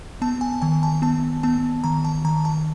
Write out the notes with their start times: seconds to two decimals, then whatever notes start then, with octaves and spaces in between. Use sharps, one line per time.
0.22 B3 A5
0.41 G#5
0.62 D#3 G#5
0.83 A5
1.02 B3 A5
1.43 B3 A5
1.84 D#3 A#5
2.05 A5
2.25 D#3 A#5
2.45 A5